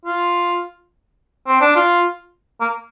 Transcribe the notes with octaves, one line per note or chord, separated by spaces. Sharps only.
F4
C4
D4
F4
A#3